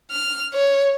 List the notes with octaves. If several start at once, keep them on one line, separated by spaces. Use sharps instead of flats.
F6
C#5